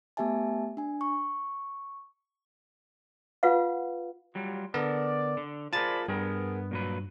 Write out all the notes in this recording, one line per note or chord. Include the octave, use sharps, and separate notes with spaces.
A3 B3 G4 E5 G#5 A5
D4 G#5
C#6
F4 B4 F5 F#5
F#3 G3 F4
D3 B3 A4 A#4 D5
D3
F4 G#4 A#4 C5 D5 A5 B5 A6
G2 B3 G#4 A#4
A#2 F#3 B4